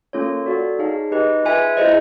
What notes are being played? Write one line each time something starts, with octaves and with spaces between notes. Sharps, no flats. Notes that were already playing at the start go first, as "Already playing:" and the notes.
A#3 C#4 F4 A4 C#5
F#4 A4 D5 F5
D#4 G#4 C#5 F5 A5
D#4 G4 B4 D#5
F4 G#4 B4 E5 G#5
E4 G#4 C5 D#5